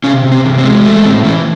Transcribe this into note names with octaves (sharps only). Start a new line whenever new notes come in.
C3 C#4
C3
C4
E3
C4
G#3
A3
A2 C4
E3 C#4